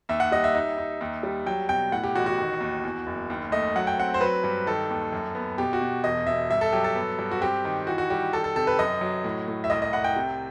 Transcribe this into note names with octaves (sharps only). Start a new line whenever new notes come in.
D#2 E5
F#5
G3 D#5
E5
D#4
D#4
D#2
G3
F#3 G5
B2 G5
A2 F#5
G4
A1 F#4
F#4
D#3
D#2
E2
F#1
D#2
A3 D#5
F#3 F#5
G5
C4 F#5
C5
F#3 B4
G2
D#3 A4
D#2
F#2
B3
B2 G4
F#4
B2
E1 D#5
B2 E5
G2 E5
A4
F#3 G4
A4
B3
G2
F#4
C4 G4
D#3
E3 F#4
F#4
G3 G4
D#3 A4
A4
C3 A4
B4
F#2 D#5
F#3
A2
A2
E5
C2 D#5
D#5
C2 F#5
G5
C3